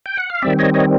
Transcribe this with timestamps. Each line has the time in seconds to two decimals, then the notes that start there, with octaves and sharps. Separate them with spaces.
0.06 G5
0.17 F#5
0.30 F5
0.42 D#3 G3 C4 D5 E5
0.59 C#5 D#5
0.74 C#5 D#5